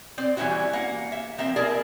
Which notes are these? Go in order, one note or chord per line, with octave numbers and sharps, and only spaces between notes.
C4 C5 D5
E3 G3 A#3 C#4 E4 F#4
A#3 F#5
E5
F3 A#3 C4 E5
E4 G#4 A#4 D5 A5